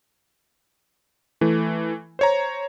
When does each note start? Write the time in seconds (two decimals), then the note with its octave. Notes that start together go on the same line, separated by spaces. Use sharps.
1.41 E3 A3
2.19 C5 C#5 A#5